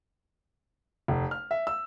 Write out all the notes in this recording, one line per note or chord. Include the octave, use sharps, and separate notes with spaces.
F1
F6
E5
E6